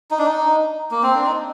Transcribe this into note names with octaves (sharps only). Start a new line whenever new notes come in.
D#4
D4
D#4
A#3
C4
D4
D#4